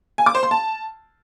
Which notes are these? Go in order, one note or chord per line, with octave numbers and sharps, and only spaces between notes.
G#5
D6
C5
C6
A5